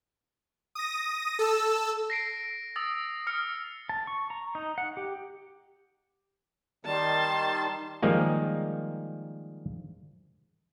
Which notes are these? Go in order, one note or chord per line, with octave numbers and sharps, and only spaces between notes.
D#6 A#6
A4 E6
A#6 C7 D7
D#6 E6 A6
D#6 F6 C#7
A5
C#6
A#5
D#4
F#5
G4
D#3 G3 A5 C6
D#3 F3 G3 G#3 A#3